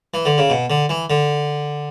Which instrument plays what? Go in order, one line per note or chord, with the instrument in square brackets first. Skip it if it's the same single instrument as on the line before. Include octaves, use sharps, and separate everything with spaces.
[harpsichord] E3
D3
C#3
B2
D3
E3
D3